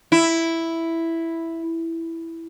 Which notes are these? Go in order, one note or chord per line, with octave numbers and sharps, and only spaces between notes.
E4